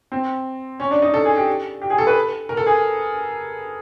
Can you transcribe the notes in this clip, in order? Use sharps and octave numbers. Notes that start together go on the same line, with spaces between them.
C4
C#4
D4
D#4
A4
G#4
G4
G4
G#4
A4
B4
A#4
A4
G#4